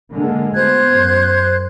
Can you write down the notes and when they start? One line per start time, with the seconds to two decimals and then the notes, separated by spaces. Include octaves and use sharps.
0.13 D3 G#3 A#3
0.54 D2 B3 C5 F#6 G#6
0.89 F#2